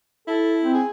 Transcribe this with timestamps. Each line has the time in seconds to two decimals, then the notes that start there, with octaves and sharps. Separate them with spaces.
0.28 E4 A4
0.62 C4
0.74 G#4